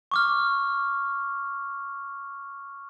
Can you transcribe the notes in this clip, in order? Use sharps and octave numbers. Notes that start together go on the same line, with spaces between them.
C#6 D6 F6